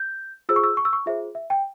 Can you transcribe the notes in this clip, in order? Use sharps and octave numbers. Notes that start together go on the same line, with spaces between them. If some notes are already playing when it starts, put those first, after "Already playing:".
Already playing: G6
F4 G#4 C5 E6
C#6
E6
C#6
E6
C#6
F4 G#4 C5 E5
E5
G5